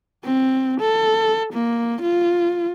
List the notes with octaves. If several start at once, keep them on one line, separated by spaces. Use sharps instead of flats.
C4
A4
A#3
F4